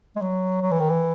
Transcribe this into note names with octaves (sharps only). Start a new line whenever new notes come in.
G#3
F#3
F#3
E3
D#3
E3